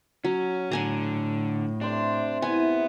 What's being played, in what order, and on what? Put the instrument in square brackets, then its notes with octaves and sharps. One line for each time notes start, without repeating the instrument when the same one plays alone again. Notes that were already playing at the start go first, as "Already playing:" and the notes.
[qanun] F#3 [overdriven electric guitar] C#4
[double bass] A2 [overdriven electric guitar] D3 [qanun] F#5 G#5 A#5
[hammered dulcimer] C3 C5 E5 [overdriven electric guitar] D4
[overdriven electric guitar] B3 [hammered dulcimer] E4 [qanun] G#5